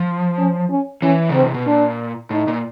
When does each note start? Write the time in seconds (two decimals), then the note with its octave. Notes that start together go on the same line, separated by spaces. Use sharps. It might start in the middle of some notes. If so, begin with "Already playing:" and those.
Already playing: F3
0.38 C#4
0.70 C#4
1.02 E3 C#4
1.29 C#3 C4
1.42 C3
1.54 B2
1.67 A#2 D4
2.31 A2 D#4
2.48 A#2